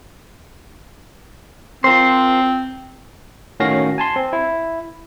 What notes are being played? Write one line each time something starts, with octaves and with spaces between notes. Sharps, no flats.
C4 F4 A#4 C5
A2 D#3 C#4 F#4 F5 A#6
G#5 A5 C6
C4
E4